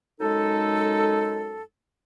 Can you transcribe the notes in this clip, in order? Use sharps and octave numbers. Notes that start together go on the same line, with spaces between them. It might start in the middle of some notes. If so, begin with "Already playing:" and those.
F#2 G#3 D#4 A4